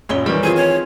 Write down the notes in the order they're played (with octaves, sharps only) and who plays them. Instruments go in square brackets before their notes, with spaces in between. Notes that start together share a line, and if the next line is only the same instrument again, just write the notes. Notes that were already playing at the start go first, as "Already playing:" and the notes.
[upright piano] D#1 F#2 G7 [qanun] C#5 D#5 E5
[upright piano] D#3 E3 [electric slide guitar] G3 [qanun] B5
[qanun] C4 F4 [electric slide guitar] G#4 [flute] G#5
[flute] C#5